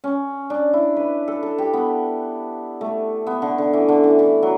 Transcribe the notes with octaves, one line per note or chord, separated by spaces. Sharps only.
C#4
D4
E4
B4
A4
A4
G4
B3
A3
B3
D3
D3
E3
D3
E3
E3
F#3